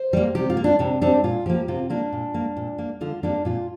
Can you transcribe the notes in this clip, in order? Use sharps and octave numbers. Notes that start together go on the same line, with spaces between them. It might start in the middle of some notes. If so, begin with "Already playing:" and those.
Already playing: C5
G3 A#3
C3 G4
F4
A#3
D4
C3 D4
G3 C4 D4
A#2 F4
F3 A#3 G4
C3 F4
A#3 D4
A#2
A#3
A#2
A#3
D3 F4
G3 A#3 D4
A#2 F4